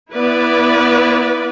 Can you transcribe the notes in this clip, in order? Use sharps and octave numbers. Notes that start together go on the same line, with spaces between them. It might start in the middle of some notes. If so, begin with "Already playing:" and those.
B3 E4 B4 D5